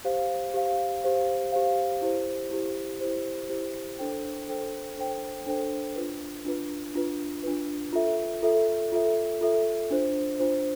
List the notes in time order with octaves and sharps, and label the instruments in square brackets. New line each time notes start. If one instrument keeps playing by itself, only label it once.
[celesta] G4 C5 F5
G4 C5 F5
G4 C5 F5
G4 C5 F5
E4 G4 C5
E4 G4 C5
E4 G4 C5
E4 G4 C5
D4 A4 C5 G5
D4 A4 C5 G5
D4 A4 C5 G5
D4 A4 C5 G5
D4 F4 B4
D4 F4 B4
D4 F4 B4
D4 F4 B4
F4 A4 E5
F4 A4 E5
F4 A4 E5
F4 A4 E5
D4 F4 C5
D4 F4 C5